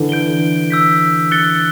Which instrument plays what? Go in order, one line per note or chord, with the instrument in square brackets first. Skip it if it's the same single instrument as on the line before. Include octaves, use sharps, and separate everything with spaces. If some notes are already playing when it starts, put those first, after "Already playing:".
Already playing: [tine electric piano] D3 E3
[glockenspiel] G6 D7 G7
E6 G6 B6
F#6 A6 C#7 G7